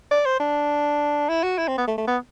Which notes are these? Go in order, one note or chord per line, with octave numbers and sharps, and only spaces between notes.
D5
C5
D4
E4
F#4
E4
C4
B3
A3
A3
B3